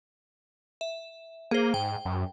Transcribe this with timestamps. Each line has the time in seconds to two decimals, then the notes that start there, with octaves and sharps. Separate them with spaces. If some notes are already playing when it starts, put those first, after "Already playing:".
0.81 E5
1.51 A#3 G#4 C5
1.74 G#2 G5
2.05 F#2